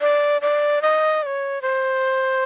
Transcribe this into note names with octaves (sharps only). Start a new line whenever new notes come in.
D5
D5
D#5
D5
C#5
C5